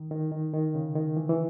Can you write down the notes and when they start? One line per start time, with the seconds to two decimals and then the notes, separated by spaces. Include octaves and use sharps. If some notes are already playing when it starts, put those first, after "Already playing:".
Already playing: D#3
0.11 D#3
0.32 D#3
0.54 D#3
0.75 C#3
0.96 D#3
1.17 E3
1.29 E3